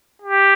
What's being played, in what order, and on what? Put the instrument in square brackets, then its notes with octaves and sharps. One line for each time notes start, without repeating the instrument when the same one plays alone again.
[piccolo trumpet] G4